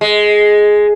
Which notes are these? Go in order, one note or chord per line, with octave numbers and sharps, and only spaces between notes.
G#3